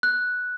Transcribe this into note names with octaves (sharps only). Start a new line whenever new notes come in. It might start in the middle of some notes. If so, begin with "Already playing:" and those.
F#6